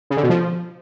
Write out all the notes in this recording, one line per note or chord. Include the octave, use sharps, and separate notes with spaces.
C#3
D3
B2
F3